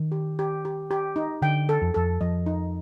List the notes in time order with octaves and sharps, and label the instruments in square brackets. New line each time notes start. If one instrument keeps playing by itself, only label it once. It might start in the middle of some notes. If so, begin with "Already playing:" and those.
Already playing: [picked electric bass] D#3
[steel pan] G4
G4
G4
G4
D#4
[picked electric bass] D3 [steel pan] G5
[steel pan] A4
[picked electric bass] F2
[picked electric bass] F2 [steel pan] A4
[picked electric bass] F2 [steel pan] D#5
[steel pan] D#4